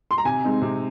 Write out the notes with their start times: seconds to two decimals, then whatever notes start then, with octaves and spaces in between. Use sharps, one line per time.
0.11 C6
0.18 A#5
0.25 C3 G#5
0.44 G#3 C4 D#4
0.62 C3